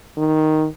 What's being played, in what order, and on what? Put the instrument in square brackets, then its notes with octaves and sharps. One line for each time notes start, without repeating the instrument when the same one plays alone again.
[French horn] D#3